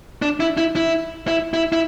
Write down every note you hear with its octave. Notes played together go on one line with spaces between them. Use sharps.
D4
E4
E4
E4
E4
E4
E4